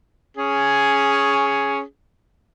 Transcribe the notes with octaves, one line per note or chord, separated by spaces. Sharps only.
C#4 G#4